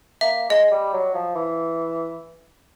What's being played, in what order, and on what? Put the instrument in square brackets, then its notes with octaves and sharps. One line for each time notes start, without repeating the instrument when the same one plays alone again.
[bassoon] A#3 [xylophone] E5
[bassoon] G#3 [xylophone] D#5
[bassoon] G3
F#3
F3
E3